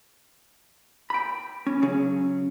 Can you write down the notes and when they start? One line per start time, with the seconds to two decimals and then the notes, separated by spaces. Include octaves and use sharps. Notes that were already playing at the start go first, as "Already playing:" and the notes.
1.10 G5 B5
1.67 C#4
1.82 C#3 F#3 C#4 G#4